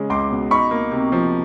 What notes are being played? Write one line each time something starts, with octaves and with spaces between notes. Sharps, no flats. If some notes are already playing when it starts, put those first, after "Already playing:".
Already playing: C#3 G#3 C#4
C#2 C6 D6
B2
D#4 B5 C#6
A#3
C3
F3